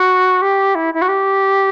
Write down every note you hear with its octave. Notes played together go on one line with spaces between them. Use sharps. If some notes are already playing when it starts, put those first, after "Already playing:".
Already playing: F#4
G4
E4
E4
F#4
G4